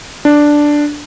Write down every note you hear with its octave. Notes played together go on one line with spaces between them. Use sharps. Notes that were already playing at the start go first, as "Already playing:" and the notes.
D4